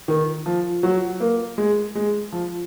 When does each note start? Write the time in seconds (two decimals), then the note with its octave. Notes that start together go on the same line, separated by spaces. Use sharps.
0.08 D#3
0.46 F3
0.83 F#3
1.20 A#3
1.58 G#3
1.95 G#3
2.32 F3